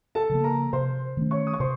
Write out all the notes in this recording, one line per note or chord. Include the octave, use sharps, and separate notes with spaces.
A4 A5
C#3 F3 A#3
A#4 A#5
C3 C5 C6
D#3 A3 C#4
C#5 C#6
D#6
C#6
C3 C5 C6